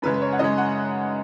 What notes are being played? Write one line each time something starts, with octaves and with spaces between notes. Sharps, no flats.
F#2 C#3 G#3 B4
B4
C#5
F#5
F#2 C#3 G#3 D#5
F#5